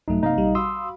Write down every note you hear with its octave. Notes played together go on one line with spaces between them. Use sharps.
A#1 G2 F#3 A3 D#4
C3 A#3 D#4 D#5 F5
A#1 G3
F#4 F5 B5 C6 D#6 E6